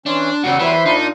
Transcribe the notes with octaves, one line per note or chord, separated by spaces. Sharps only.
E3 C#4 D4 C6
E2 C#3 F#3 G3 F#4 F#5 E6
E3 C5 E5 B5
A#2 D4 D#4 F4